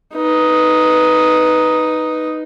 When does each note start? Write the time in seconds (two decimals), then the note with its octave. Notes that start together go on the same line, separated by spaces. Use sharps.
0.15 D#4 B4